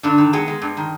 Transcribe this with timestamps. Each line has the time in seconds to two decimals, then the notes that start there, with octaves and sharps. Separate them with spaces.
0.03 G2 D3 D4
0.18 D#3
0.33 G#3 B3 G#4
0.48 G#3
0.62 G2
0.77 D#3